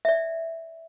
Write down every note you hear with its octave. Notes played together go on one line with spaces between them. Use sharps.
D5 E5